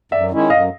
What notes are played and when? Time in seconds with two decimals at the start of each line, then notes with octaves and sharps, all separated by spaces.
0.12 F#2 D5 E5
0.31 D#3 G#3 C#4 E4
0.50 F#2 D#5 F5